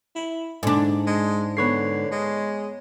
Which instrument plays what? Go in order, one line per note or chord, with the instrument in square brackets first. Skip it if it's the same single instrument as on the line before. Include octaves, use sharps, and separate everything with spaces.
[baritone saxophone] E4
[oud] G#2 D4 [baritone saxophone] D3
[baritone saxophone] G#3
[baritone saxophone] D3 [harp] B3 C#5 C7
[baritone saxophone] G#3